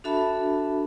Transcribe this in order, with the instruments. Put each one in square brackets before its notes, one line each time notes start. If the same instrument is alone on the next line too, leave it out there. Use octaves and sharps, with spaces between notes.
[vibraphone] D4 F#4 A4 E5 A5 B5